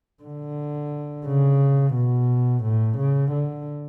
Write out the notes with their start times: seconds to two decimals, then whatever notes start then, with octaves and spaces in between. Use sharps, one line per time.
0.23 D3
1.26 C#3
1.95 B2
2.64 A2
2.98 C#3
3.32 D3